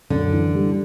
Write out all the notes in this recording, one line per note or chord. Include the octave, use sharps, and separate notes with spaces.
F#2 D3
E3
G3